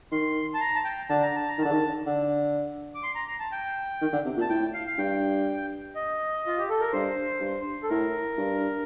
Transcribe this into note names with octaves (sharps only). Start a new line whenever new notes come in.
D#3 C6
A5
A#5
A5
G5
D3 A5
A#5
A5
A#5
D#3
D3 A5
D#3
D3
D6
C6
A#5
A#5
A5
G5
D#3
D3
C3
A#2
A5
A2 G5
F5
F5
G2 G5
D#5
F4
G4
A4
A#4
G2 C5
G2
A4
A2 A#4
G2